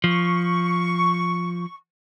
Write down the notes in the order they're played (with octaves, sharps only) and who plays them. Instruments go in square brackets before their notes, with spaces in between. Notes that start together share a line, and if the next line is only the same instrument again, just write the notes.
[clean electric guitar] F3 [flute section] C#6